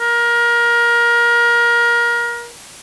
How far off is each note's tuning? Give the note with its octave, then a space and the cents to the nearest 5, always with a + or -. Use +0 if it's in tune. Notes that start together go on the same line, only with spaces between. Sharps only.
A#4 +25